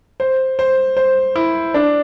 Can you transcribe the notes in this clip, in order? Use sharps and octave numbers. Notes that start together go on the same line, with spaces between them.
C5
C5
C5
E4
D4